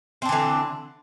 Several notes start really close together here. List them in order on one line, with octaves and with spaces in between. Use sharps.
C4 D4 E3 D3